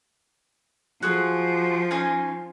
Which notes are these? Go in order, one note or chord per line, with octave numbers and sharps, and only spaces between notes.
F3 F#4 G#4 C6
C#4 D#4 G#5